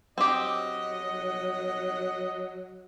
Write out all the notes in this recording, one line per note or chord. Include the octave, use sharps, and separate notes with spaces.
F#3 C4 G4 D#5